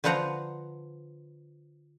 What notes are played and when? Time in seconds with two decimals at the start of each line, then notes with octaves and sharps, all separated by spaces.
0.04 D3 F3 B4 C5 F#5 A#5